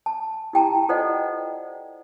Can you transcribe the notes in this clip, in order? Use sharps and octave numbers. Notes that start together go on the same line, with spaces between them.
A5
E4 G4 G5 A5 A#5
F4 A4 C5 D5 D#5 F#5